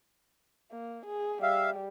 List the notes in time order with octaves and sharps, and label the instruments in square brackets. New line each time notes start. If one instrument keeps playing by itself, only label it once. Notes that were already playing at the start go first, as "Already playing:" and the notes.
[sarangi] A#3
G#4
[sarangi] G3 [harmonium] E5 F5